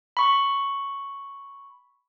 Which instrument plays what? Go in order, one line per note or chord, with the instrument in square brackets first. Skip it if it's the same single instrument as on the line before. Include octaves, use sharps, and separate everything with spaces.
[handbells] B5 C#6